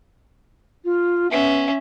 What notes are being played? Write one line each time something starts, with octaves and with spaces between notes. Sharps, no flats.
F4
B3 C#4 E5